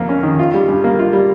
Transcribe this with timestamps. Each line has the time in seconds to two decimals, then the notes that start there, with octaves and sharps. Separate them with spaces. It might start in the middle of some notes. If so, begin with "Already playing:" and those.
Already playing: F2 A#3
0.09 C#4
0.23 D#3
0.39 F4
0.54 G3
0.68 G2
0.84 A#3
0.99 F4
1.13 G3